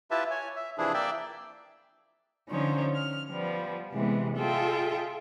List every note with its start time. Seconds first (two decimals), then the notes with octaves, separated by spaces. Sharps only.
0.11 E4 F4 G4 B4 E5 A5
0.31 C#5 G#5
0.56 E5
0.78 C3 E3 F3 D4 E4 G#4
0.94 A#3 D5 E5 G5
2.49 D3 F3 C#4 D#4 C5 C#5
2.95 F6
3.30 F3 G3 B3
3.93 C3 E3 G#3 B3
4.37 F4 G#4 A4 D#5 E5 G5